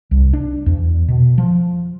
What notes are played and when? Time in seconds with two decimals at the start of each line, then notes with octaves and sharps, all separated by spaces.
0.11 C2
0.33 D4
0.66 E2
1.08 B2
1.38 F3